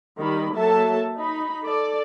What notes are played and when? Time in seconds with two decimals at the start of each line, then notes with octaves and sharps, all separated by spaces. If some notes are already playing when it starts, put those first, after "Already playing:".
0.18 D#3 G3 B5
0.55 F#3 A#3 A4 E5 A5
1.18 D#4 B5
1.63 A4 D5